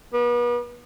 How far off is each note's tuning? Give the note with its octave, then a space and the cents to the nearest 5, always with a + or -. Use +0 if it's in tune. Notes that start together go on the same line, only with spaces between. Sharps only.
B3 -40